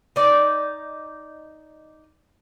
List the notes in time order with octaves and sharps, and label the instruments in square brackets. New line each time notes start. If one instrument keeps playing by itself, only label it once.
[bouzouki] D#4 D5